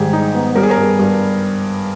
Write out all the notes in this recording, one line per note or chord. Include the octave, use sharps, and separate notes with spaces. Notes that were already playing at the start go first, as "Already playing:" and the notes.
Already playing: G#2 D#3 G3 G4 G#4
D#4
B3
G3 A#4
G#4
A#4
G2
G2